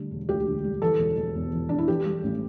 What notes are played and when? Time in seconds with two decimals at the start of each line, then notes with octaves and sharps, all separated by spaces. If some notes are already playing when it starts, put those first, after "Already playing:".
Already playing: D3 G3 A3
0.11 E1
0.29 D2 G4
0.47 D3
0.64 G3
0.82 E3 A4
0.99 E1
1.17 E1
1.35 E2
1.52 E3
1.69 E1 D4
1.78 E4
1.88 E3 G4
2.05 G3
2.23 A1